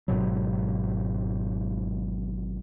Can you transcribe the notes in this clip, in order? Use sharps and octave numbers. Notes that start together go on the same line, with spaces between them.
G#1 G#2 B2 F#3